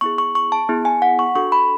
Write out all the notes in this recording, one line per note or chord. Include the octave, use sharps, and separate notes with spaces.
B3 E4 G#4 C#6
C#6
C#6
A5
B3 E4 G#4
G#5
F#5
C#6
D4 F#4 A4 C#6
B5